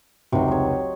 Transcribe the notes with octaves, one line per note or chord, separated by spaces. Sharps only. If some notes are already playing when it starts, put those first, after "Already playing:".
F1 C#2 C3 F#3 D#4
C#5 D#5